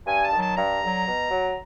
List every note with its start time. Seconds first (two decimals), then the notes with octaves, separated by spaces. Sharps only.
0.06 G2 G#5
0.24 A5
0.32 D#3 F#3
0.41 A5
0.57 G2 A#5
0.82 D3 F#3
1.07 B2
1.31 F#3